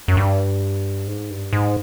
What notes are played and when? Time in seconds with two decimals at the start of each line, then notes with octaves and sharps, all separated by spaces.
0.08 F#2
0.17 G2
1.07 G#2
1.30 G2
1.53 G#2